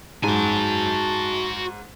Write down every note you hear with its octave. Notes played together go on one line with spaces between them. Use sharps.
G#2 F#4 G#5 A5